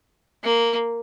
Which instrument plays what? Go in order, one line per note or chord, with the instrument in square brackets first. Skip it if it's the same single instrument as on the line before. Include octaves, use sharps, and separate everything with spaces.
[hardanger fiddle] A#3